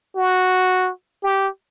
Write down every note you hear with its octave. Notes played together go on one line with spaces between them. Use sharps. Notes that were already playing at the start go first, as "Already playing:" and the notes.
F#4
G4